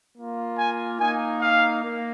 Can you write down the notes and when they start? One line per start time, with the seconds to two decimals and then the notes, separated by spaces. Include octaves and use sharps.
0.17 A#3 F4
0.58 G#5
0.99 A#3 D#4 G#5
1.41 F5
1.83 A#3